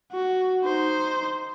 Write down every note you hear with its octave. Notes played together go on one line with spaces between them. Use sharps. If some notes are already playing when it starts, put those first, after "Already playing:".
F#4
D#4 C5